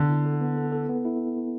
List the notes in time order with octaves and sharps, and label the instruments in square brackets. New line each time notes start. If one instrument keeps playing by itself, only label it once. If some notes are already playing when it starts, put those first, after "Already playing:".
Already playing: [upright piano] D3 [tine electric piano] B3
[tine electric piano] E4
A4
B3
A4
A4
B3
E4